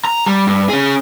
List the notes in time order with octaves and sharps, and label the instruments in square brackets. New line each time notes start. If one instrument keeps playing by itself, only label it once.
[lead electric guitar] A#5
G3
G2
C#4 G#4